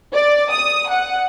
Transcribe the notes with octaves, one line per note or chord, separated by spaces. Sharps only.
D5
D#6
F#5